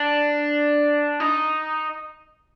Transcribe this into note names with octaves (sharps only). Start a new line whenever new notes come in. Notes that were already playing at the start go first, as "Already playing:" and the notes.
Already playing: D4
D#4